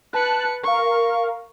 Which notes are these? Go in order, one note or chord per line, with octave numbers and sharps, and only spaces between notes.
B4 A5 F#6 C#7
A#4 F5 C#6